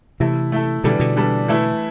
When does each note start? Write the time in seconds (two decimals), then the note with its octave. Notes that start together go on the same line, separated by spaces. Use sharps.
0.20 C3 E3 A3 E4 A4
0.52 A3 E4 A4
0.84 B2 D3 E3 G3 D4 A4
1.00 B2 D3
1.17 E3 G3 D4 A4
1.48 E3 A3 E4 A4